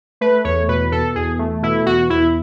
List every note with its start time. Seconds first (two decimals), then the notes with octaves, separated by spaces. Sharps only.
0.21 A3 B4
0.44 E2 C#5
0.68 B2 B4
0.92 B2 A4
1.15 E2 G#4
1.39 A3
1.62 B2 E4
1.86 E2 F#4
2.10 E2 E4